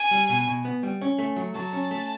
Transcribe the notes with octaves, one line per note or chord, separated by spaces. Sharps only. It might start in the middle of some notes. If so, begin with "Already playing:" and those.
Already playing: G#5
G3
B2
B2
B3
G3
C#4
A3
F#3
F#3 A5
C#4
A3